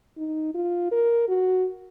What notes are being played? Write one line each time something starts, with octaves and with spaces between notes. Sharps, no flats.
D#4
F4
A#4
F#4